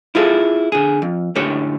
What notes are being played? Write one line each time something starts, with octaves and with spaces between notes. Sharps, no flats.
E4 F4 G#4 A4
D3 G#4
F2
F#2 A2 D3 G4 C#5